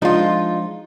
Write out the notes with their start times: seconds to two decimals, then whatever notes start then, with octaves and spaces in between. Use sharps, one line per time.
0.02 F3 G#3 D4 D#4 F4